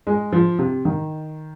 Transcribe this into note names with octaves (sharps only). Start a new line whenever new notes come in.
G#3
F3
C3
D#3